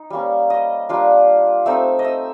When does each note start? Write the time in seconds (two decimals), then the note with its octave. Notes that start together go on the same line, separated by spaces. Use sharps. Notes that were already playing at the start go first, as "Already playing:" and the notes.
Already playing: D#4
0.10 G3 A#3 C#4
0.50 D#5
0.89 G3 A#3 D4 F4
1.66 A3 C4 D#4 E5
1.99 D#5
2.05 E5